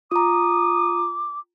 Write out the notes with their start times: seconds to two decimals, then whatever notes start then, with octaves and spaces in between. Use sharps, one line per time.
0.12 F4 A#5 D6 D#6